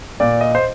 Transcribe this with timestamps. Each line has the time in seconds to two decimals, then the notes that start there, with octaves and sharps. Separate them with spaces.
0.20 A#2 D5
0.41 D#5
0.55 C5